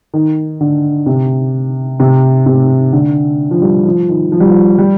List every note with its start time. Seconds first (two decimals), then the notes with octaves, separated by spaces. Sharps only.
0.14 D#3
0.61 D3
1.06 C3
2.00 C3
2.46 C3
2.93 D3
3.51 F3
3.62 G3
3.85 F3
4.09 D#3
4.32 F3
4.40 G3
4.49 F3
4.78 G3